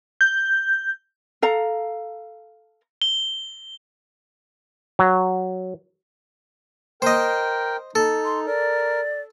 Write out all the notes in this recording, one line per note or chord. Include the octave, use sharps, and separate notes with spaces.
G6
A4 F5 A#5
G7
F#3
A#4 C5 D#5 G5
D#4 A4
C6
A#4 D5